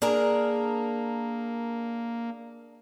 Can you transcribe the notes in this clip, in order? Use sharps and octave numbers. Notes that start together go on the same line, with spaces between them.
A#3 D4 G#4 A#4